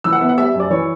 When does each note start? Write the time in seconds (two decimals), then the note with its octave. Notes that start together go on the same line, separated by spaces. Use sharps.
0.04 E3 E6
0.12 F#5
0.21 B3 E5
0.29 F#5
0.37 G3 E5
0.54 F#2
0.60 D5
0.70 E3 C#5